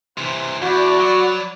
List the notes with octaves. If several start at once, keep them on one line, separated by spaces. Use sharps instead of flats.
C3 E3 C5 C6
E2 F#4 D5 B5
F#3